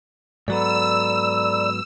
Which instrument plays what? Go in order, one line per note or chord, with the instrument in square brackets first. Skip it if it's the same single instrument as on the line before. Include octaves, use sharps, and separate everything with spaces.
[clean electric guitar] G#2 F#3 B3 [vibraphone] A4 A#5 B5 [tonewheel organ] D5 [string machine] E6